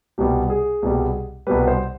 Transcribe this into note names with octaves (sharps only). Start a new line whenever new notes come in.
C2 B2 G3 G4
G#4
C2 B2 G3
C2 B2 G3 B4
C5